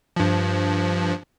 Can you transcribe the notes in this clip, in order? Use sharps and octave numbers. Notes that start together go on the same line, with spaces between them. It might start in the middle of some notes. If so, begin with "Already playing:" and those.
G2 F3